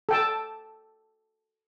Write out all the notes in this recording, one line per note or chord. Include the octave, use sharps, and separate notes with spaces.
A4 G5 A5